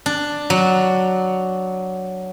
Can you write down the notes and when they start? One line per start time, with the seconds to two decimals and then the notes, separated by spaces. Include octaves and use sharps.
0.06 D4
0.50 F#3